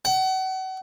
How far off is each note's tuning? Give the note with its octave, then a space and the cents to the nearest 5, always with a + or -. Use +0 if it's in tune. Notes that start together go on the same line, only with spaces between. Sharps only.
F#5 +35